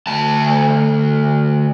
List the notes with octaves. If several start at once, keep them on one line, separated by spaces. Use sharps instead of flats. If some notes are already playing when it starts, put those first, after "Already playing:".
D2 A5